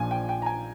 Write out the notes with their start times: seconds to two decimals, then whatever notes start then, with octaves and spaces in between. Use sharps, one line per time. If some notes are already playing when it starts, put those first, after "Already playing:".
Already playing: A#1 A#2 F3 G#5
0.11 G5
0.29 G5
0.42 A#5
0.46 G#5